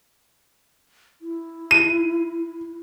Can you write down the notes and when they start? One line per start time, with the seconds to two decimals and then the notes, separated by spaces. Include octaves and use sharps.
1.22 E4
1.71 D#7